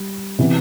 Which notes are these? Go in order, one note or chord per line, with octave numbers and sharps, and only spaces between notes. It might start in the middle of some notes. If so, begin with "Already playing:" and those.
Already playing: G3
C3 E3 B3